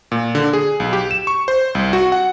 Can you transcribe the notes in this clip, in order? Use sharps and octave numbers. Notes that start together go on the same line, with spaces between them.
A#2
D3
G#4
B1
G4
E7
C#6
C5
C2
F#4
F#5